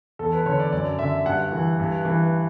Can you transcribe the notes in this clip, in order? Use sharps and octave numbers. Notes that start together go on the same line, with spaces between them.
E2 A4
B4
D3 C#5
D5
F#2 D5
D3 E5
G2 F#5
E3
G2
E3